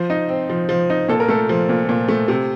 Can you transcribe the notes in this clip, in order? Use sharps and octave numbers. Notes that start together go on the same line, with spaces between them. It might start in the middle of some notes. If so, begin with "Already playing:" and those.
Already playing: F3 C5
D#4
C4
F3
F3
D#4
A#2 A4
A#4
A3 A4
F3
A#2
A#2
A3
C3